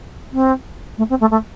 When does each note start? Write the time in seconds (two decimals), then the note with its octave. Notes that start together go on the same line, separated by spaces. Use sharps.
0.32 C4
0.98 A3
1.09 C4
1.20 A3
1.31 A3